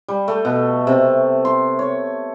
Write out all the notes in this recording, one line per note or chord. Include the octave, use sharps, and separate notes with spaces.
G3
A3
B2
C3
C6
C#5